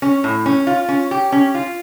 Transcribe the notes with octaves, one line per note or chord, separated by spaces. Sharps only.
C#4
A2
C#4
F4
C#4
G4
C#4
F4